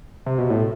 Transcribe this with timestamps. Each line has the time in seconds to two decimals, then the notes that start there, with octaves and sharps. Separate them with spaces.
0.26 C3
0.38 B2
0.50 A2